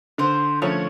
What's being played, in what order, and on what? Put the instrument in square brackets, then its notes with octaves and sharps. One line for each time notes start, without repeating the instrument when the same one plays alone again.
[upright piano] D3 [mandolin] C5
[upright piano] F3 A3 C#4 [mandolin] C#5